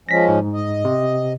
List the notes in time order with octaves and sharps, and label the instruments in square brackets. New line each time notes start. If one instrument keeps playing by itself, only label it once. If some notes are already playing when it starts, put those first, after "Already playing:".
[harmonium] F3 G#3 C#4 [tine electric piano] A#6 B6
[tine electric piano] G#2
[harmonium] D#5
[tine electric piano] C3